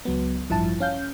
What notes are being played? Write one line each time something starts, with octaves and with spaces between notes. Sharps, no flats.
C#2 F#3 B3
A1 G2 F3 E4 A5
C#4 F5 G6